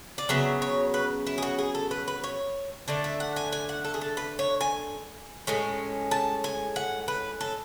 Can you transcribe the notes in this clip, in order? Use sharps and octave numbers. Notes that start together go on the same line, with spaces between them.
D5
C#3 F#3 B3 E5
C#5
B4
E4
G#4
F#4
G#4
A4
B4
B4
C#5
D3 A3 D4 D5
E5
F#5
G#5
G#5
F#5
A4
G#4
A4
B4
C#5
G#5
A2 G#3 C#4
A5
G#5
F#5
B4
A4